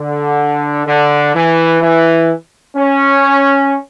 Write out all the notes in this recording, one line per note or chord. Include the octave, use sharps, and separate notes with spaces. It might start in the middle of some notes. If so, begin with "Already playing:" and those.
Already playing: D3
D3
E3
E3
C#4